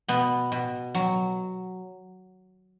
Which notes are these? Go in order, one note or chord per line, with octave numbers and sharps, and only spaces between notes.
B2 B3
B2
F#3